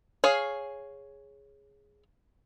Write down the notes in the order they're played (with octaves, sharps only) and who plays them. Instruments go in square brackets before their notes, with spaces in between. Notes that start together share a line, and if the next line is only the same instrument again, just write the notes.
[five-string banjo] G#4 C#5 F5